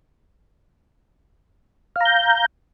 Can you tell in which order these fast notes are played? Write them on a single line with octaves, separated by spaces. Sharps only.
F5 A#5 G6